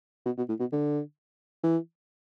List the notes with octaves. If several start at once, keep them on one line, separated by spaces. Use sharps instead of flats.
B2
B2
A2
B2
D3
E3